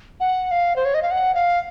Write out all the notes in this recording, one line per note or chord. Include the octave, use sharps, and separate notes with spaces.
F#5
F5
C5
C#5
D#5
F5
F#5
F5